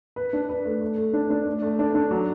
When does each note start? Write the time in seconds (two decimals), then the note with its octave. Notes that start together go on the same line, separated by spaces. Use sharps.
0.16 B4
0.33 D4
0.49 B4
0.65 A3
0.81 A3
0.98 A3
1.13 D4
1.30 D4
1.47 A3
1.62 A3
1.79 D4
1.95 D4
2.11 F#3